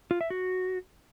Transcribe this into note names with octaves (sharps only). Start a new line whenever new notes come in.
F4
E5
F#4